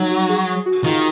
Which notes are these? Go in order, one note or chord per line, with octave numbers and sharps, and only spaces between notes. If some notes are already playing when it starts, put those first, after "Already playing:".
Already playing: F#3 D#4
F#4
G#4
G#4
F#4
D#3 F4